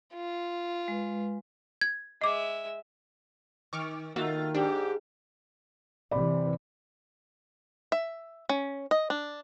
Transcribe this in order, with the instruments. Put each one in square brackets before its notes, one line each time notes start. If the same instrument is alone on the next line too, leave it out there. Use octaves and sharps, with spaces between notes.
[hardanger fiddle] F4
[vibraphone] G#3 B4
[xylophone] G#6
[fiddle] G#3 E5 [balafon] D#5 D6
[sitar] D#3 [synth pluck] C#6 D6 F6
[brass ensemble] D#3 [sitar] A3 F4 [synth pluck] A#3 F#4 E5
[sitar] G#2 [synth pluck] D4 [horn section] G4
[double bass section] C3 E3 [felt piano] D5 B5
[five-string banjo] E5
C#4
D#5
D4